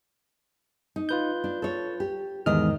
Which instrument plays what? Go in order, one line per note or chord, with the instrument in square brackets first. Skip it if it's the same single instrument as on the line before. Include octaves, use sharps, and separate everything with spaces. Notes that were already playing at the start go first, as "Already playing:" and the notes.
[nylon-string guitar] D#4
[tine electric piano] F4 B4 G6
[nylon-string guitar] D4
A4 C#5
G4
[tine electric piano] E2 G#2 F6 [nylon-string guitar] D#3 D#5